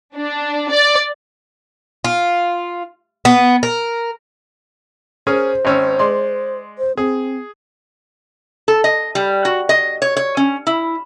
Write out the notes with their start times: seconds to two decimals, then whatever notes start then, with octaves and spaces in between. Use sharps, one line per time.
0.16 D4
0.71 D5
2.04 F4
3.25 B3
3.63 A#4
5.27 C#4 G#4 A#4 C5
5.65 G#1 C#4 E6
5.99 G#3 D5 C6
6.78 C5
6.97 C4 G#4
8.68 A4
8.84 D#5
9.15 G3
9.45 F#4
9.69 D#5
10.02 C#5
10.17 C#5
10.37 C#4
10.67 E4